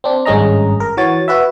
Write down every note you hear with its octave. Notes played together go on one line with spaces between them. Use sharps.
C4 D4
G#1 G2 G#3 C#4 D#5 A#5
A#4
E3 F#4 C#5 A6
F#4 B4 E5